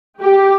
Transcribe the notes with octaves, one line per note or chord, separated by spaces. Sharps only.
G4